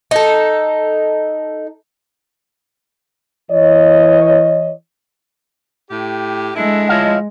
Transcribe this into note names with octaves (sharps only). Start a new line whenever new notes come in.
D#4 A4
E3 C#5 D#5
A2 G4
G#3 D4 E4 A4
F3 E4 C#5 D#5 F5 A5